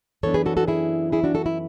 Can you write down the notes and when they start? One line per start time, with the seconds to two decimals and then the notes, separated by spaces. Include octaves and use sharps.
0.23 F#2 E3 B3 D4 A4 C#5
0.34 G#4 B4
0.46 F#4 A4
0.57 F#4 A4
0.68 E4 G#4
1.12 E4 G#4
1.24 D4 F#4
1.35 F#4 A4
1.46 E4